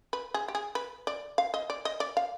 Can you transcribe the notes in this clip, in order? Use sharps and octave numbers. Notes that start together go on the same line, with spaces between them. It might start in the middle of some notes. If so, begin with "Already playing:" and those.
B4
G#4
G4
G#4
B4
D5
F5
D#5
D5
D#5
D5
F5